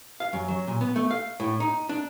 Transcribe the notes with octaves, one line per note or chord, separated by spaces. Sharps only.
F5
F#2
F#3
A#2
B3
A3
F5
A2
D#4
D4